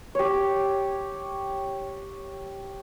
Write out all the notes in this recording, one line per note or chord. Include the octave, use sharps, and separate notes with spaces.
G4 C#5